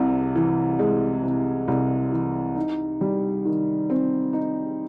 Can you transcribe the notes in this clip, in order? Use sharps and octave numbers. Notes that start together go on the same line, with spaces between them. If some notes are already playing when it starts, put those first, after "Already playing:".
Already playing: C2 C3
E3
G#3
C3
C2
E3
D#4
G3
D#3
C4
D#4